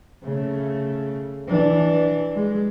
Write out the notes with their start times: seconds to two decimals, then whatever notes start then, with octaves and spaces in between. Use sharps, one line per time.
0.23 C#3 A3
1.48 E3 D4
2.35 G#3